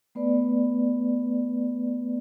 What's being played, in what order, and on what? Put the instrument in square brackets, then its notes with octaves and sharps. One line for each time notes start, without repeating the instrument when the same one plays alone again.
[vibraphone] A3 B3 B4 D5